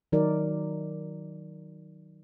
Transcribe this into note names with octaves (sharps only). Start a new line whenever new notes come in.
D#3 F#3 D#4 A#4 D5